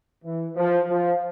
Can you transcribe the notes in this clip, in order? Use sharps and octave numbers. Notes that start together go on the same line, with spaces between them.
E3
F3
F3